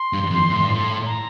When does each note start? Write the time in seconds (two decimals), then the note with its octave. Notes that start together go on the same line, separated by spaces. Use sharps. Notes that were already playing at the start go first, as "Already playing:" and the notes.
Already playing: C6
0.13 G2
0.31 F2
0.50 A2
0.61 G2
0.70 A2
1.06 A#5